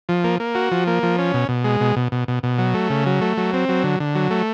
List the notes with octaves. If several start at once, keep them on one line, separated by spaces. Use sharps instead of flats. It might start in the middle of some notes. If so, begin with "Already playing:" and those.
F3
A#3
A#3
F#4
F3
A#3
F3
C#4
B2
B2
G#3
B2
B2
B2
B2
B2
F#3
A3
C#3
F#3
A3
F#3
C4
F#3
D3
D3
F#3
A3